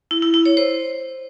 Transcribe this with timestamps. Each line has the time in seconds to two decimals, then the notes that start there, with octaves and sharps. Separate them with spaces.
0.11 E4
0.22 E4
0.34 E4
0.45 C#5
0.57 C5